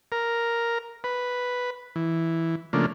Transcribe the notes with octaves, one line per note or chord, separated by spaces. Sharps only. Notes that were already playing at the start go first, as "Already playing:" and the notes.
A#4
B4
E3
C#3 F3 A3 A#3 D4